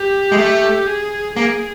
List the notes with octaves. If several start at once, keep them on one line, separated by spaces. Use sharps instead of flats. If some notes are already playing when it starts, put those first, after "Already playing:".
Already playing: G4
G#3
A3
G#4
A#3 G#4